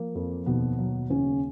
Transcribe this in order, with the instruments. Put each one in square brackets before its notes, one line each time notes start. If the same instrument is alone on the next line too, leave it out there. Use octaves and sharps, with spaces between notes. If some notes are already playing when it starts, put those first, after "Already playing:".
Already playing: [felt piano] F3 A#3
F2
D#2 B2 B3
F#3
D#2 C#3 C#4